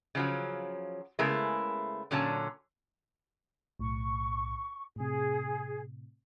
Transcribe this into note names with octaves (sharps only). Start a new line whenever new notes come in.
C#3 F3 F#3
C#3 G#3 A3 B3 E4 A#4
A#2 D3 F#3 C#4 A5
B1 A2 C#6
A2 C3 G#4